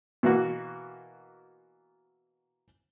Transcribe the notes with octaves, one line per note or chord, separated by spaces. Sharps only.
B2 E3 A#3 F#4